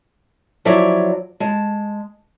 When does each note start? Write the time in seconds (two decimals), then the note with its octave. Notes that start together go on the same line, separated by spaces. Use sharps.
0.65 F3 F#3 E4 C#5 D5 E5
1.40 G#3 A5